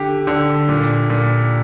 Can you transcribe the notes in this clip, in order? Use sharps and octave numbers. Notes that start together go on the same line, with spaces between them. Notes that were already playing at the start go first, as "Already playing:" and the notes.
Already playing: D3 G4
D3
A#2
A#2